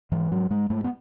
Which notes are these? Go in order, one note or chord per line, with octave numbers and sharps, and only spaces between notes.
G#2 E3
G#2 F#3
G#2 G#3
G#2 A3
B3